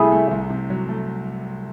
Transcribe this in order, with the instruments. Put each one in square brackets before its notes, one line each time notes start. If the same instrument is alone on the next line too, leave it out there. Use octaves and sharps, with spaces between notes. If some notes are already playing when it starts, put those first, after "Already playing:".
Already playing: [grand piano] C2 C3 A3 [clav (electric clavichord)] E4 G#4
[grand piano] A3
C2
C3
F#3
A3